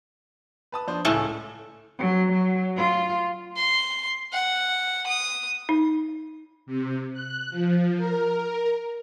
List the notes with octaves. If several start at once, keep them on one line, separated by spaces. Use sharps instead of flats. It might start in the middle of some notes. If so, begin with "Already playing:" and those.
B4 A5 D#6
F3 D4 C5
C#2 A2 A3 C#4
F#3
F#3
F4
C6
F#5
D#6
D#4
C3
F#6
F3
A#4